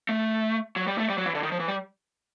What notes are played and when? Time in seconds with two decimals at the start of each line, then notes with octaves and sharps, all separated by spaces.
0.09 A3
0.76 F#3
0.87 G3
0.98 A3
1.09 G3
1.18 F#3
1.26 E3
1.35 D3
1.43 D#3
1.52 F3
1.59 E3
1.68 G3